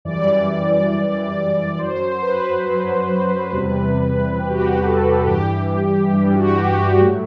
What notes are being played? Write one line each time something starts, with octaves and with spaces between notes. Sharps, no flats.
F#2 E3 G3 D5
F#2 E3 G3
F#2 F#3 C5
C5
B4
F#2 F#3
E2 C3 G3
E2 C3 G3 G4
F#4
G4
A4
F#4
G2 E3 G3 G4
G2 E3 G3
F#4
G4
F#4
A2 F#3